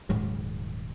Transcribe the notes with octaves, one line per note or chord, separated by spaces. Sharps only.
D#1 G#2 C#3 F#3